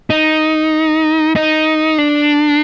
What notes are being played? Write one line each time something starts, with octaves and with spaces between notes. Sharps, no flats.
D#4
D#4
D4